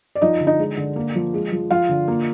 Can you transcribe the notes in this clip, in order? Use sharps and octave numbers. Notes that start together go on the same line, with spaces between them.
D5
F3 D#4 D#5
D3
D#4 D#5
G#3
D3
A#3
F3
G#3
F3
F3 F4 F5
D3
A#3